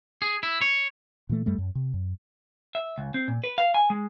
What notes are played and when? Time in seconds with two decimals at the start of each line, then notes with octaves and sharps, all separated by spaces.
0.22 G#4
0.43 E4
0.62 C#5
1.29 A#2 E3 A3
1.46 F#2 G3 A3
1.58 F#2
1.75 C3
1.94 F#2
2.75 E5
2.98 C#2
3.14 C4
3.28 A#2
3.44 B4
3.58 F5
3.74 G#5
3.90 G#3